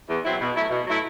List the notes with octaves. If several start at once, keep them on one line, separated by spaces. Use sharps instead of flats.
E2
B2 F#3 C4 E4
B2
F#3 A3 E4
B2
F#3 A3 E4